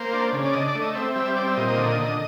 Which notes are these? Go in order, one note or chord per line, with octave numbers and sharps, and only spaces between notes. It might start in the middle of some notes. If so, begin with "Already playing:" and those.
Already playing: A#3 C5
D4
C#3
D5
D4 D#5
D5
A3
D#5
C4 E5
G3 E5
C4 D5
E5
A#2 D#5
D#5
D3
D3